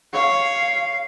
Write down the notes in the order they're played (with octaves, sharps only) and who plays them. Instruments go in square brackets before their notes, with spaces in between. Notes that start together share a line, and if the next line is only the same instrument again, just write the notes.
[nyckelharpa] C#5 [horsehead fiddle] F5